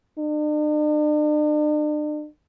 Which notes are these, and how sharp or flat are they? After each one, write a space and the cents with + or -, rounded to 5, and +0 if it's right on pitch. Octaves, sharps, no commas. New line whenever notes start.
D4 +45